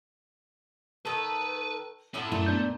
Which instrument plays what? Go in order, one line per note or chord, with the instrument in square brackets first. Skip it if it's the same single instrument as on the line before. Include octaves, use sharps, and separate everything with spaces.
[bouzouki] D#3 A4 [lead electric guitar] B4
[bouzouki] A2 E4 F4 [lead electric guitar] C#4 F#5
[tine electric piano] F#2 E4 [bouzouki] A#2 [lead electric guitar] A3
[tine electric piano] B3 D4 G6